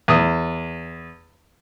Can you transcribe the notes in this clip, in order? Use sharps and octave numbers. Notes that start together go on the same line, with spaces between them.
E2 D#6